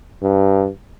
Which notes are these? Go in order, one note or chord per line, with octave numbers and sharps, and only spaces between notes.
G2